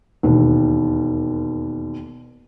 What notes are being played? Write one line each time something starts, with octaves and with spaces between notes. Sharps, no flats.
E1 D#2